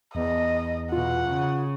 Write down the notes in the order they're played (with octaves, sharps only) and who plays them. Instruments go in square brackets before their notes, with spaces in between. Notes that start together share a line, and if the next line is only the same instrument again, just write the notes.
[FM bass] E2 [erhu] D#5
[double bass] B2 [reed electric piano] F4 [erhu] F#5
[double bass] C#3